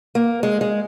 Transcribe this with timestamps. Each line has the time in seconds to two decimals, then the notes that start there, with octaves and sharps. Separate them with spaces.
0.15 A#3
0.43 G#3
0.61 G#3